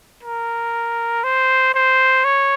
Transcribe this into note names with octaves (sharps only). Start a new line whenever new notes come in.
A#4
C5
C5
C#5